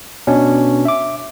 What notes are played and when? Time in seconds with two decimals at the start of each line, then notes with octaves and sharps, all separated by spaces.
0.27 B2 C#4 D4
0.85 E5 D6